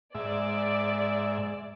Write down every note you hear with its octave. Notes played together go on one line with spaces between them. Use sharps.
G#2 D5 E5